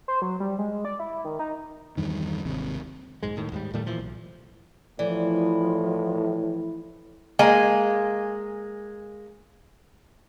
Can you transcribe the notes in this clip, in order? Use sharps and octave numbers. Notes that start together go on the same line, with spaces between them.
C5
F#3
G3
G#3
D5
E4
D#3
D#4
E2 G2 D#3
G#1 D#2 C3
B1 G#2 G#3
D#1 A2 D#3
D#2 G#2 G3
A2 D#3 G3 A3
A#2 E3 F3
B1
A2 E3 F3 D5
G#3 A#3 G#5